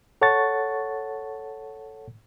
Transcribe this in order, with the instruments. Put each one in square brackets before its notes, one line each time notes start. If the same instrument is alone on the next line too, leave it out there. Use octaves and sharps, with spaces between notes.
[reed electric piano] A4 C#5 F#5 A5 C#6 A6